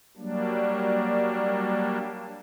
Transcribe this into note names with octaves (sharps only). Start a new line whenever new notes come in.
F#3 G3 A#3 D4